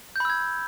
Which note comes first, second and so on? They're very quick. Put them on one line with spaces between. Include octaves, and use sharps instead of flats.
G6 B5 E6 G#6